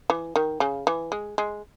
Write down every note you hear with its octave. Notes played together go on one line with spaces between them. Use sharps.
E3
D#3
C#3
E3
G#3
G#3